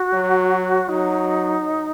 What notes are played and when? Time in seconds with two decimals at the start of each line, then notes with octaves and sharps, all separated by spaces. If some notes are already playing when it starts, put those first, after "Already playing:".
Already playing: F#4
0.13 F#3
0.89 F#3 D#4